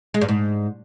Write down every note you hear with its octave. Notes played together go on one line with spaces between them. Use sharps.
G#3
G2
G#2